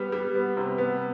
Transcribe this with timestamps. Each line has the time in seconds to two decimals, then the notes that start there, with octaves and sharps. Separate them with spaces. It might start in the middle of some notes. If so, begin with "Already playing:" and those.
Already playing: G3 B3
0.12 G3
0.35 B3
0.57 C3
0.78 B3